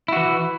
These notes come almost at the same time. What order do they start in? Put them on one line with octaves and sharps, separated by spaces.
E4 F#4 E3